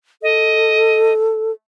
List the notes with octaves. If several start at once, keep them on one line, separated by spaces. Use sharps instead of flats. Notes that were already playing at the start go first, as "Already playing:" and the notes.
A4 D#5